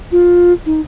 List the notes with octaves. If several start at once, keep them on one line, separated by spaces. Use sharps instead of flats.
F4
D#4